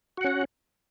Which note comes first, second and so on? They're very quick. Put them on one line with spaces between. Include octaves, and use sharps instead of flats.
F#4 F#5 C#4